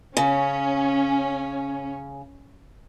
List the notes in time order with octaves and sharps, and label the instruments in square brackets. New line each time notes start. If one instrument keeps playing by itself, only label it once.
[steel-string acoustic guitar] C#3 [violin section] C#4